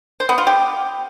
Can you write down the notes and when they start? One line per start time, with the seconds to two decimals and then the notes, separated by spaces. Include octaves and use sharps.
0.20 C5
0.29 B3
0.38 F4
0.47 G4